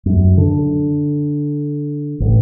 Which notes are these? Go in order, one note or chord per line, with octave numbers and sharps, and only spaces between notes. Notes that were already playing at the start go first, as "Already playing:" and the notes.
F#2
D3
A1